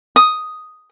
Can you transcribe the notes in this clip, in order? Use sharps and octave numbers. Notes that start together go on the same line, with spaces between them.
D#6